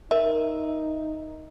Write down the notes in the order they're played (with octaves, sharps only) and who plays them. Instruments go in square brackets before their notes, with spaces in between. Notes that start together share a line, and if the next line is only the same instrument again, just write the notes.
[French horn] D#4 [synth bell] A#4 [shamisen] E5